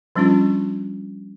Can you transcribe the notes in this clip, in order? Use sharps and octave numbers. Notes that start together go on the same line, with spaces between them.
F3 G3 C#4 D4 F4